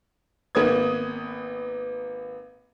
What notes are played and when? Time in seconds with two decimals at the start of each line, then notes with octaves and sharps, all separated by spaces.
0.55 G#1 A#3 B3 B4 D#6 G#6